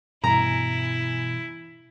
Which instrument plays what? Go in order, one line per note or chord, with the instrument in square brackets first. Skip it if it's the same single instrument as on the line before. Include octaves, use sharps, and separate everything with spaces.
[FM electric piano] G2 E3 G#5 [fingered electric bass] B2 [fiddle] E4 [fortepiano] A#5